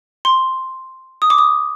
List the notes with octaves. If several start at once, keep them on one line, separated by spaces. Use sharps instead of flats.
C6
D#6
D6
D#6